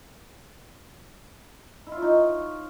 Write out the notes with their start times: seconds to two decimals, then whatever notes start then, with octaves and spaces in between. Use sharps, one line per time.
1.87 E4
1.92 F4
1.97 C#5
2.02 D#4